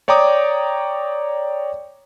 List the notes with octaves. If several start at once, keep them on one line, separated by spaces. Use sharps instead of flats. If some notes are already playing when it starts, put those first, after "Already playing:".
C#5 D5 G5 A#5 D6 D#6